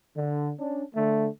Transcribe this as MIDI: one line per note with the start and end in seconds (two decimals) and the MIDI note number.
0.16 0.52 50
0.58 0.82 61
0.58 0.82 62
0.95 1.27 50
0.95 1.27 57